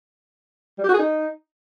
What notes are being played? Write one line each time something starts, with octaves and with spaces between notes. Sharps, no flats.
G3
G4
F#4
G#4
D#4